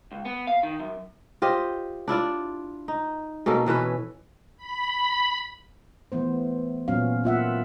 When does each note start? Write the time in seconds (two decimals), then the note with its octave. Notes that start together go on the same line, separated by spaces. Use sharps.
0.12 C#2
0.25 B3
0.47 F5
0.63 D#3
0.80 F#2
1.42 F4 G4 C5 D#5
2.08 D4 E4 F4 D5
2.88 D#4
3.46 B2 A#3 C#4 A4
3.66 B2 E3 C#4 B4
4.57 B5
6.12 E3 A3 B3 C5
6.88 A#2 F#3 B3 C#4 F5
7.24 A#3 F4 E5 F#5